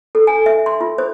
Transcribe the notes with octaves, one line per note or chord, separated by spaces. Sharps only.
A4
G#5
E5
C6
F4
C5